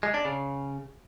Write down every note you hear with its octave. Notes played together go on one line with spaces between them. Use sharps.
G#3
D4
C#3